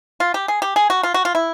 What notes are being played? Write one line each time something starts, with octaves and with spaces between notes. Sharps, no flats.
F4
G4
G#4
G4
G#4
F#4
F4
F#4
F4
E4